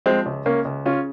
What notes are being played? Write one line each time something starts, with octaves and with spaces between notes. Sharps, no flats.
F3 G#3 C4
C#2
C#2 A#3 C#4
C#2
C#3 C#4 F4